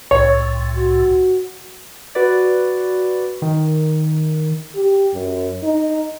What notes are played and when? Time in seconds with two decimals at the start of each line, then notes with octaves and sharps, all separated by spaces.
0.11 C2 A2 C#5
0.77 F#4
2.15 F#4 B4 D5
3.42 D#3
4.75 G4
5.14 F#2
5.63 D#4